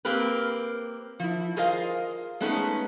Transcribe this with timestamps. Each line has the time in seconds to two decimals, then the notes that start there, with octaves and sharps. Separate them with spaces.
0.05 A#3 C4 G4 A#4 B4
1.20 F3 E4
1.56 F4 G#4 A#4 C5 D#5 F5
2.40 G#3 A3 B3 C#4 D#4 G#4